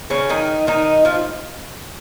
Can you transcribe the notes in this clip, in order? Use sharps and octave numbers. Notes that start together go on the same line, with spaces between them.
C#3 C#4
D#3 D#4
D#3 D#4
F3 F4